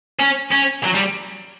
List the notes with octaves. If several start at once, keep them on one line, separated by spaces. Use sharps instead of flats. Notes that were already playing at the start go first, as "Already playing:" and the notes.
C#4
C#4
F#3
G3